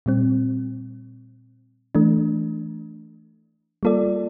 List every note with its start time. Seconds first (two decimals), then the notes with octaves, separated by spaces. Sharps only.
0.06 A#2 G3 C4
1.95 E3 A3 D4
3.83 G3 A#3 F4 A4 D5